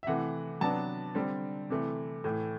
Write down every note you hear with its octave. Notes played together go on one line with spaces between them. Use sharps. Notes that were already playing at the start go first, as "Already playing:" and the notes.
E5
C3 E3 A3 F#5
C3 F#3 B3 D4 A5
D3 G3 C4
C3 E3 A3
A2 E3 A3